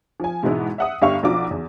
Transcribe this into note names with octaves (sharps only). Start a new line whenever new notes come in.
F3 G#5
G#2 B2 E3 G#3 B3 E4
E5 F#5 D#6
G1 G4 E5 F5 C#6
B1 F3 D4 F4 F#4 D6
E2